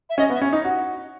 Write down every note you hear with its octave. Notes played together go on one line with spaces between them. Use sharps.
E5
C#4 D#5
B3
E5
C#4
D#4
F#4